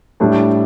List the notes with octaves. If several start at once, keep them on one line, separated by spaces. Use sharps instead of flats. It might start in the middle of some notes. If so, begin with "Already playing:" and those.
A2 G3 D4 A4